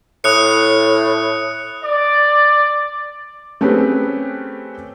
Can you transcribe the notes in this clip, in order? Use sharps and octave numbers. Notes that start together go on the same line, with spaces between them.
A2 D#6 F#6 C#7
D5
A3 C4 C#4 G4 G#4 B4